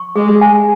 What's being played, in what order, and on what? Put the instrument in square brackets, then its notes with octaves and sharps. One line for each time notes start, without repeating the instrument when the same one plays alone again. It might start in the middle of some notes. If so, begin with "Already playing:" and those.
Already playing: [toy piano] C#6
[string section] G#3 [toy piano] G#4
[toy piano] G#5